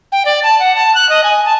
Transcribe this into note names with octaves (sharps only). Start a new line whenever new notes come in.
G5
D5
A5
F#5
A5
F#6
D#5
G#5
A5